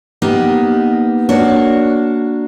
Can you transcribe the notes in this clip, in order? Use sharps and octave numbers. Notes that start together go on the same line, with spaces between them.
A#3 B3 D#4 G4
A#3 D4 F#4 C#5